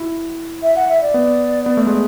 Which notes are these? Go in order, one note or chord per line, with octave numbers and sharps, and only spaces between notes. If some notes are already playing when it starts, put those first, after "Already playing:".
Already playing: E4 F#4
E5
F#5
E5
D5
B3
B3
A3
G#3